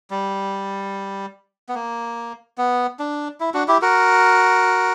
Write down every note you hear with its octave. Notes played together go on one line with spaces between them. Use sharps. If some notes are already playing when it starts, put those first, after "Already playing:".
G3
B3
A#3
B3
D4
E4
D4 F#4
E4 G4
F#4 A#4